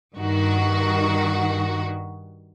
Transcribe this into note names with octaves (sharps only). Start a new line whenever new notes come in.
G2 D#3 F#4